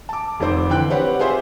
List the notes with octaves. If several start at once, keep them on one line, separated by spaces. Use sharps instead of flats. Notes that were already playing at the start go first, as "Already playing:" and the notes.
A5 D6
F1 F2 D#3 C4 C5 D6
D3 E3 G5 F#6
C4 G4 B4 C#5 F#5
F4 G4 G#4 C5 E5 C6